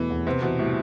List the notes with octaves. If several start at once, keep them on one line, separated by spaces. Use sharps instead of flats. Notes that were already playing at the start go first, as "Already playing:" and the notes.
Already playing: E2 B2 E3 A3
E2
C3 B3
B2 E3
A2 G3